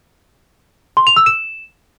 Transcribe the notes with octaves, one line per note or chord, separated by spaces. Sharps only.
C6
F7
E6
E7